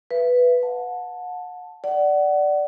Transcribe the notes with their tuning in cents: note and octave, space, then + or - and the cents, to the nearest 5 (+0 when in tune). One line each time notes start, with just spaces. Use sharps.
B4 +0 E5 +40
F#5 -35 A5 +0
D5 +0 F#5 +25